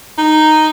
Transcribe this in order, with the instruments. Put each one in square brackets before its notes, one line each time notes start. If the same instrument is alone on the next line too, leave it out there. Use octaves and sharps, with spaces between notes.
[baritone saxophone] D#4